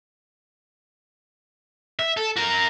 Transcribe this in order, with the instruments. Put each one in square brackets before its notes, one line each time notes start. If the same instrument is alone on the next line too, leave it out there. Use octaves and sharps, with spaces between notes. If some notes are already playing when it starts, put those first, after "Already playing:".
[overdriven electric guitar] E5
A4
F#4 A#4